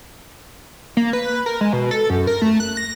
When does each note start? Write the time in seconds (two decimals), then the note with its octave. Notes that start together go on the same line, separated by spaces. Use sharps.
0.97 A#3
1.13 B4
1.46 A#4
1.61 G#3
1.73 B2
1.91 A4
2.10 F#2
2.27 A#4
2.42 A3
2.60 F#6
2.77 A#6